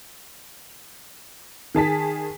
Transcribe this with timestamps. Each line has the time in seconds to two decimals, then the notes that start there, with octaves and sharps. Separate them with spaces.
1.75 D#3 G#4 A5 B6